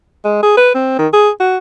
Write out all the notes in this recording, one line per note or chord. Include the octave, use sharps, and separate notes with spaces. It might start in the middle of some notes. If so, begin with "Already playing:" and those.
G#3
G#4
B4
C4
D#3
G#4
F#4